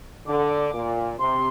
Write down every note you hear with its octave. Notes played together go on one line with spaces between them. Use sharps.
D3 D6
A#2
C3 C6